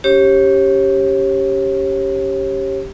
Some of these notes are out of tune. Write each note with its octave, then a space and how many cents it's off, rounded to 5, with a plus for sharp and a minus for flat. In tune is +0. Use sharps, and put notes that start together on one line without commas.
C#4 +20 G4 +0 C#5 -35